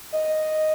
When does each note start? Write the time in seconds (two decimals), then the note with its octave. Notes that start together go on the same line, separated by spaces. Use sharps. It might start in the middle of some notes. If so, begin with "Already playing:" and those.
0.12 D#5